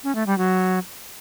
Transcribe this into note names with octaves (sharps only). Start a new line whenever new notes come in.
C#4
A3
G3
F#3